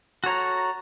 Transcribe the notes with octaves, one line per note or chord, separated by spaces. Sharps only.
F#4 A4 C#5 A#5